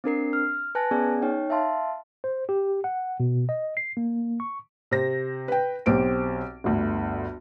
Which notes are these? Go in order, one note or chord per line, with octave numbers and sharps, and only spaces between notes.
C4 D4 A#4 C7
F6
B4 G#5 A5 F#6 A#6
B3 C#4 G#4 D5 G#5
D#4 C#5 G5
E5 F5 A5 C6
C5
G4
F#5
B2
D#5
C7
A#3
C#6
C3 C5 A#6
B4 G5
B1 C4 G4 D7
G1 D2